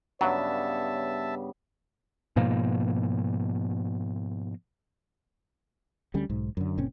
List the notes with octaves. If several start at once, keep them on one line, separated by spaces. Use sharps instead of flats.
G2 C#3 F#3 B3 C#5 E5 A5
G#2 B2 F3 A#3
D2 D3 G3 C#4
B1 G#2
F#2 D3
F#1 A#2 C4 C#4